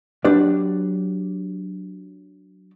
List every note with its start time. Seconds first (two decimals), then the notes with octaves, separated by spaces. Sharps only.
0.25 F#3 D4 G4 B4 D5